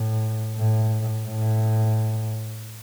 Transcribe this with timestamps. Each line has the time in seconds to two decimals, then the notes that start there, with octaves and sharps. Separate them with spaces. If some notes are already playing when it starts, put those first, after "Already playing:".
Already playing: A2
0.56 A2
1.27 A2